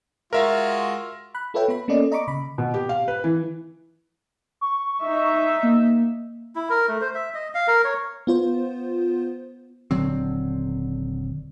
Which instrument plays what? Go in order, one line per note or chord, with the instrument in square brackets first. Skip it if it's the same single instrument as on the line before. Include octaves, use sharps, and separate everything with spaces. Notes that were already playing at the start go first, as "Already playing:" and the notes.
[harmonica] G#3 F4 F#4 [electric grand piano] A#4 E5 F5
[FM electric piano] B5 F#6
F4 A4 B4 C#5 E5 G5
B3 B5
A#3 B3 C#4 A4 D5 D#5
D#5 A#5 B5 C#6 D6
C#3 B5
[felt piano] B2
G4
F5
B4
E3
[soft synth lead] C#6
[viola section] D#4 E5
[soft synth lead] A#3
[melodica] E4
A#4
A3
C5
E5
D#5
F5
A#4
C#5
[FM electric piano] B3 F4 C5
[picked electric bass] D#1 D3 F#3 C4